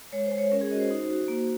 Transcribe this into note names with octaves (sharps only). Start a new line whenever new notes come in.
G#3 C#5
C5
G#3
C#5
C#4 A#4
G#4
F#4 D#5
C5
D#4
F#4
A#3